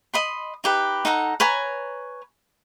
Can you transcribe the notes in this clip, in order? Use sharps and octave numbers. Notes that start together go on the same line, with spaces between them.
D#5 B5 C6
D#4 G4 B4
D#4 A4 F#5 A#5
B4 C#5 G#5 A#5